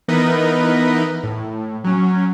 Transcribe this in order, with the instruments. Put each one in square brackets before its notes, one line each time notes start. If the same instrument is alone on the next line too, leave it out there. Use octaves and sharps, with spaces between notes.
[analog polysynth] E3 B3 D#4 A#4 B4 D#5
A2
F#3 C#4